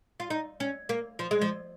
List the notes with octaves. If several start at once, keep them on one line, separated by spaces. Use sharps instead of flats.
F4
D#4
C#4
A#3
F3
G#3
F3